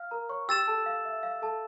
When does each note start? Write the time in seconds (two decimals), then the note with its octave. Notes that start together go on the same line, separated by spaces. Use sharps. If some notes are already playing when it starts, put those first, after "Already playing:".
Already playing: F5 F6
0.11 A#4 A#5
0.29 C#5 C#6
0.48 G4 G5 E6 A6 E7
0.67 A4 A5
0.86 F5
1.05 E5
1.23 F5
1.42 A4 A5